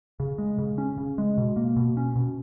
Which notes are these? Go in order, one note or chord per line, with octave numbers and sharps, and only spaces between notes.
C#3
G#3
C#3
C#4
C#3
G#3
B2
A#3
B2
C#4
B2